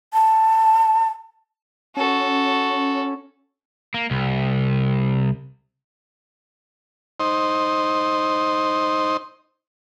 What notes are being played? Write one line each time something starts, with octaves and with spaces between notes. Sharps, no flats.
A5
C#4 F#4 A4
A#3
C2
D#4 C5